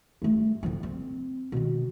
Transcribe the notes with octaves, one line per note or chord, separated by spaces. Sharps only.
G2 A3
D3 F3
C4
B2 D#3